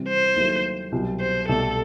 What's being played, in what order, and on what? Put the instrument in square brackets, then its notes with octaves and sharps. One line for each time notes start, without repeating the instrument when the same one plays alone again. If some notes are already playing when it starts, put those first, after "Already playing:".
Already playing: [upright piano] C3 E3 G3 C4
[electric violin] C5
[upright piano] D#2 D#3 F#3 A3 E4
C2 B2 F#3
[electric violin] C5
[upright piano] C2 B2 A3 [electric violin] A4